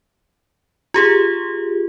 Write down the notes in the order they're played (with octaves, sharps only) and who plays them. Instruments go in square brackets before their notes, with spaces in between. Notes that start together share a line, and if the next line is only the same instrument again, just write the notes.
[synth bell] F4 G4 G#4